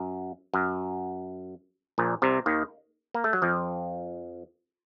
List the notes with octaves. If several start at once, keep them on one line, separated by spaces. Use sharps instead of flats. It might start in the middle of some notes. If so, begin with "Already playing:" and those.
Already playing: F#2
F#2
A#1 A#2
C2 C3
D#2 D#3
A#3
A3
F#3
F2 F3